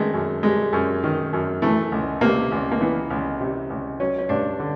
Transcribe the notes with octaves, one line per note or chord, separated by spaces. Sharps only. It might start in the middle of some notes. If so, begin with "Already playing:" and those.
Already playing: F#2 D#3 G#3 A3
F#2
G3 G#3
F#2
D#3
F#2
E3 A3
C#2
C3 A#3
C#2
A#3
E3 B3
C#2
C3
C#2
F#3 C#4
C#4
G2 D4
D3